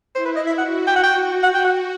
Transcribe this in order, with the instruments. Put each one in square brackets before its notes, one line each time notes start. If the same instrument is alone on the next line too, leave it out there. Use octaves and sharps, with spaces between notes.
[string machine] E4 [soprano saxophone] C5
[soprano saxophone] B4
D#5
E5
[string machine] F#4 [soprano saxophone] F#5
[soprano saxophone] G5
F#5
G5
F#5
G5
F#5